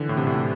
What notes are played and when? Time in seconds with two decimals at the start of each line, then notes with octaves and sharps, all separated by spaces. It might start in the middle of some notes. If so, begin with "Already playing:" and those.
Already playing: D3 E3
0.09 A2
0.17 C3
0.27 A2
0.35 C3